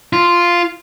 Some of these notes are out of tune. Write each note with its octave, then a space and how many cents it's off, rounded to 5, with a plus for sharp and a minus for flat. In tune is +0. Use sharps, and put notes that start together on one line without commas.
F4 -5